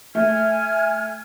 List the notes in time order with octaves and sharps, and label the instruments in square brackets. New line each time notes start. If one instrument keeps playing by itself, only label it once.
[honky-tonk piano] A3 [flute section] G#5 F6 G#6